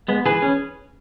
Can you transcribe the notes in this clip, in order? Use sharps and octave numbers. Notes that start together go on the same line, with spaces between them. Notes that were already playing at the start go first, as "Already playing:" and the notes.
G#3 B3
E3 G#4 B4
C#4